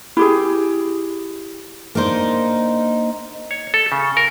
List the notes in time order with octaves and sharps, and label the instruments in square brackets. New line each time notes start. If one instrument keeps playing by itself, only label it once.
[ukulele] E4 G4 G#4
[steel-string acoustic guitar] A#3 D4 D#4 C5
[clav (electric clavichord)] C#5
A4
C#3
A#4